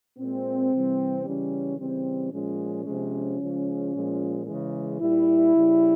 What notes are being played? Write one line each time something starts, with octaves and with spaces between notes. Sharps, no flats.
A#2 G#3 C4
C3 E3 G3
C#3 E3 G3 C#4
C#3 E3 G3 C4
A#2 F3 G#3 C#4
C3 F3 G#3
C#3 F3 G#3
A#2 F3 G#3
C#3 E3 G#3
A#2 G3 E4
C#3 G3